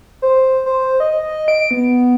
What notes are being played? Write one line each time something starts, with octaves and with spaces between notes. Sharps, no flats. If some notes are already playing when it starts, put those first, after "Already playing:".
C5
C5
D#5
D7
B3